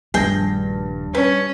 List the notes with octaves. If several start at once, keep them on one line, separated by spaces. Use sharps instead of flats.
D#1 G2 F3 A3 G#4 G5 A#6
C#4 B4